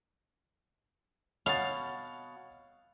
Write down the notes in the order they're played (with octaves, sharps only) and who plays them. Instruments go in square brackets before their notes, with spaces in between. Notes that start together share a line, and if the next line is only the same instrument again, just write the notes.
[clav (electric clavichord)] B2 [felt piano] C#5 F#5 A6 [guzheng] F5